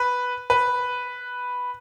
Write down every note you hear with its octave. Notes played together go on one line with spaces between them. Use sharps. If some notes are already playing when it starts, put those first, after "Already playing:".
Already playing: B4
B4